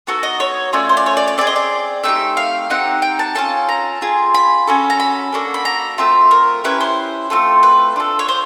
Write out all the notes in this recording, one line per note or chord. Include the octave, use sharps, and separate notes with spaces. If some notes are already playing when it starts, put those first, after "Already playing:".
B3 D#4 F#4 A4
D#5
C#5
A3 C#4 F4 D5
C5
D5
C#5
D5
D5
C4 F4 G#4 D5
D#5
D5
A3 C4 D#4 G4 E5
F5
C4 D#4 G4 F#5
G5
A5
C#4 F4 A4 A5
A#5
C4 F4 G#4
B5
C#4 F#4 A4
A#5
B5
A#3 D4 F#4 A4
B5
A#5
A3 C4 F4 E5
A#4
C#4 E4 G4 B4
C5
A3 C4 F4 A4
B4
D4 F4 A4
C#5
C5